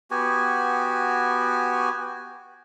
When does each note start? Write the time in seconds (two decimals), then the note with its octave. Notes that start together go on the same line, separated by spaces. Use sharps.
0.11 B3 F#4 G4 G#5